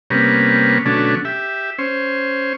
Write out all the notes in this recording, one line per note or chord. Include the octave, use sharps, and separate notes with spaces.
C3 G3 A#3 B3 C#4
B2 D3 F#3 A3 C#4 D4
G4 E5
C#4 C5